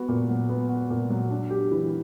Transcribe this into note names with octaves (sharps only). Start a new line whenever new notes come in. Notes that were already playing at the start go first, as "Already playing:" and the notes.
Already playing: B3 F#4
A#2
F#3
B3
F#4
A#2
F#3
D4
G4
E3